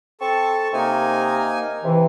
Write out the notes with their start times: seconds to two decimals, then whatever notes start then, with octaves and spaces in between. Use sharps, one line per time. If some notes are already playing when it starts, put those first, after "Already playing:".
0.21 C4 A4 A5 C#6
0.73 C3 A#3 D#4 G#5
1.84 C3 E3